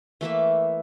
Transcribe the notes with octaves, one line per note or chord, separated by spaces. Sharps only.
E3 A3 A#3 E5